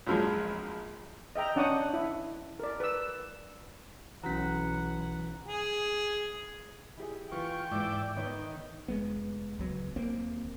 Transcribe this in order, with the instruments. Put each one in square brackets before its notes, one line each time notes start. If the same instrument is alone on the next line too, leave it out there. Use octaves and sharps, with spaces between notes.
[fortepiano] A#1 F2 F3 F#3 G#3
[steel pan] D#5 E5 G5 A#5
C#4 D4 F#5 C#6 D#6
E4
A#4 D5
B4 E6
[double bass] B1 [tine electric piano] E3 B6 [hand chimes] C#4 F#4 A#5 [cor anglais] F#5
[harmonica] G#4
[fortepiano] E4 G4 G#4
[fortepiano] E3 B4 [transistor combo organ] F4 C#6 [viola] G5
[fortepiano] E2 E3 [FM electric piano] G#2 [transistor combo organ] D5 E5 D6
[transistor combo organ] D#3 [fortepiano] B3 C#5 E5
[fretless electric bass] F1 G#3 B3
D1 C#2 F#3 B3
D1 D#2 A#3 C4